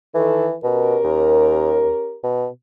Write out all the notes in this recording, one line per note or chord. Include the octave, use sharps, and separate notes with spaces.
D#3 E3 A4
B2 C#4 G4 A#4
D#2
B2